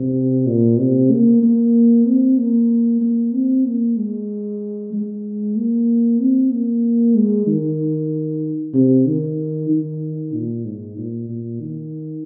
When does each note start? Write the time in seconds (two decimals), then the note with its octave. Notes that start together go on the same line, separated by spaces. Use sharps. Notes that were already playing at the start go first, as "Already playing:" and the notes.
Already playing: C3
0.47 A#2
0.79 C3
1.11 A#3
1.43 A#3
2.07 C4
2.38 A#3
3.01 A#3
3.34 C4
3.65 A#3
3.97 G#3
4.93 G#3
5.56 A#3
6.20 C4
6.51 A#3
7.15 G#3
7.47 D#3
8.74 C3
9.06 D#3
9.69 D#3
10.33 A#2
10.65 G#2
10.97 A#2
11.29 A#2
11.60 D#3